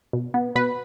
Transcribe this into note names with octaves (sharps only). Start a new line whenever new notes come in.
B2
B3
B2 B4